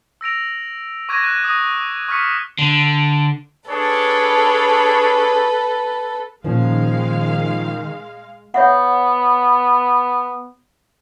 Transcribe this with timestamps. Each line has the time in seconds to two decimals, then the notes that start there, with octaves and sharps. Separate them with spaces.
0.21 E6 A#6 D7 F7
1.09 C#6 D6 F#6 G#6 A#6 D#7
1.24 F#6 G#6
1.44 D#6 A#6
2.09 C#6 D6 F6 B6 C#7
2.59 D3
3.69 D4 G#4 A4 B4 C#5
6.44 A#2 D#3 F3 G#3 C#4 D#4 F5
8.54 B3 C#5 E5 F#5